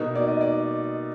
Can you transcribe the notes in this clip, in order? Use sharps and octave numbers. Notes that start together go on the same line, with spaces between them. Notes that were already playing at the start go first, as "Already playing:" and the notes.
Already playing: B2 A#3 D#4
D5
D#5
D5